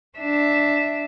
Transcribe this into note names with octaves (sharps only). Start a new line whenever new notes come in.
D4 E5